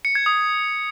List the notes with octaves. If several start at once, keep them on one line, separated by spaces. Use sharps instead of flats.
C#7
G#6
D#6